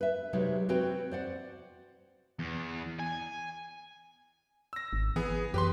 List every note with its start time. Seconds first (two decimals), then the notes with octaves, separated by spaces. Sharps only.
0.01 B4 E5
0.33 C3 F#3 G#3 D#4 G4 B4
0.69 C4 F#4 B4 C#5 G5
1.12 C5 D5 F#5
2.39 E2
2.99 G#5
4.73 E6 A#6
4.93 G#1
5.16 E3 B3 G#4
5.54 F#2 G4 B4 C6